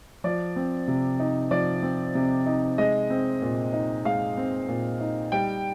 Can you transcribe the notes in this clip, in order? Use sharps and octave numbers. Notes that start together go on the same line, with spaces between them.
F3 D5
C4
C3
D#4
F3 D5
C4
C3
D#4
G#3 D#5
C4
A#2
D#4
G#3 F5
C4
A#2
D#4
G3 G5